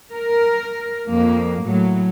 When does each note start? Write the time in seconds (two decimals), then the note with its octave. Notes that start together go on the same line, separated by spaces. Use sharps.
0.15 A#4
1.09 F2 A#3
1.62 A2 F#3